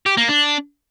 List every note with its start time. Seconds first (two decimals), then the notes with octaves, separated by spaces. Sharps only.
0.06 G4
0.17 A#3
0.29 D4